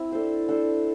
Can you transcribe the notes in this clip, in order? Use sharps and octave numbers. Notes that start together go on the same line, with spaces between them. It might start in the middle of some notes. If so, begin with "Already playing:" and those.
Already playing: C4 E4
D4 A4 C5
D4 A4 C5